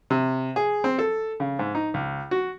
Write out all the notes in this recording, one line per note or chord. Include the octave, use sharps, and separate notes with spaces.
C3
G#4
C4
A4
C#3
G#2
D#4
C#2
F#4